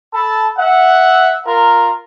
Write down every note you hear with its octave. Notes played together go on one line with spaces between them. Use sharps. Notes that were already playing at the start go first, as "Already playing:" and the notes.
A4 A5 B5
E5 F#5
F4 A#4